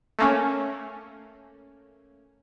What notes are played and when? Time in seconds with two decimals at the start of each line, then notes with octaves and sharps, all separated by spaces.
0.19 A3 A#3 C#4